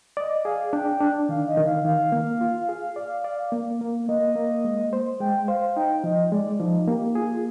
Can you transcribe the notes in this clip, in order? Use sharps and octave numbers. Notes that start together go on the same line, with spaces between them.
D5 D#5
G#4 F5
D4 G5
D4
D#3 F5
D#5
D#3
F5
D#3 F5
A#3
F4
G#4
D5
D5
A#3
A#3
A#3 D#5
A#3
G#3
C5
G#3 G5
C5 F5
D#4 G5
F3 D#5
G#3 D5
F3 D#4
A#3 G4
F4 G#4